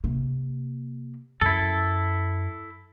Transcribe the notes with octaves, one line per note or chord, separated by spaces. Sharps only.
C3 A#3
F#2 E4 A4